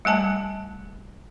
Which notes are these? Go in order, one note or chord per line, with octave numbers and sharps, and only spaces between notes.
G3 A3 G#5 A5